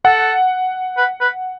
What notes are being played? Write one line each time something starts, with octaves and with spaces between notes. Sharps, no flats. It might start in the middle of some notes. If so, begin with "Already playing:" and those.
A4 F#5
B4
B4